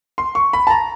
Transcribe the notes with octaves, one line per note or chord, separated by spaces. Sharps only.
C6
C#6
B5
A5
A#5